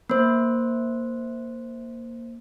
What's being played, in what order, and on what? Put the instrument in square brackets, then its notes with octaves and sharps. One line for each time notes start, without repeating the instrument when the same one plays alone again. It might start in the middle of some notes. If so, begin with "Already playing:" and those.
[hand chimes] A#3 C5